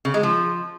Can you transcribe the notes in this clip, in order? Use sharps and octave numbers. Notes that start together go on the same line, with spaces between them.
C#3
G#3
F3